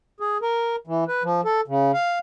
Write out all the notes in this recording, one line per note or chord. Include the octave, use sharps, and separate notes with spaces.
G#4
A#4
E3
B4
F3
A4
C#3
F5